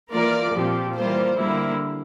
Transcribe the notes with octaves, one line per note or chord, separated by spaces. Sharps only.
E3 A#3 F4 A#4 D5
A#2 F3 C4 G4
E3 G3 A#3 F4 C5
D3 G3 A#3 E4